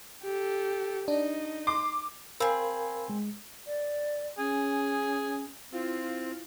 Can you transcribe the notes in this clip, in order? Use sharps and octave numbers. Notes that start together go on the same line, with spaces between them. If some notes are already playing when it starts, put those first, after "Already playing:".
G4 A4
D4 D#4 D#5
C6 D6
C4 G#4 A#4 F5 B5
G#3
D5
C#4 G#4
C4 E4 F4